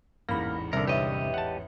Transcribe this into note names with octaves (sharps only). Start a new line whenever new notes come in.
A1 E2 G#2 A#3 B5 F6 A#6
C2 D3 A#4 E5
G4 B4 C#5 D#5 E5
F#5 A5